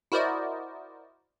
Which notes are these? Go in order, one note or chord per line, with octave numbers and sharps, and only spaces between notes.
E4 F#4 A#4 C5 D5 D#5